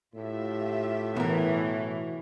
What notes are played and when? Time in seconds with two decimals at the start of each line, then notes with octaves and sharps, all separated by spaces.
0.15 A2 F4 G4 E5
1.16 B2 E3 A#4